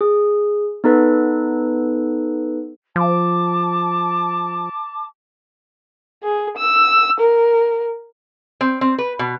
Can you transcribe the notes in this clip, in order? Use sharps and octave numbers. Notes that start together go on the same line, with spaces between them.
G#4
B3 D#4 A4 B4
F3 A5 D6
G#4
E6
A#4
C4
C4
B4
B2